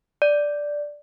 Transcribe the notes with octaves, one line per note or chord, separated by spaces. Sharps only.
D5